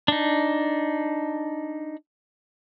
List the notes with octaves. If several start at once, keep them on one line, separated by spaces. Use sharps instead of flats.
D4 D#4